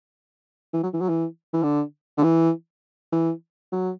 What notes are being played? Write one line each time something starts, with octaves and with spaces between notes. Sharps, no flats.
E3
F#3
E3
F#3
E3
E3
D3
D3
E3
E3
F#3